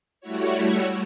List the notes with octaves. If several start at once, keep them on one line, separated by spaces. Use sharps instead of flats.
G3 A3 E4 F#4 C#5